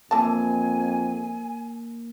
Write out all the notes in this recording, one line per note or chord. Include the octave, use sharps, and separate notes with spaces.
F2 E3 A#3 A#4 G#5 A5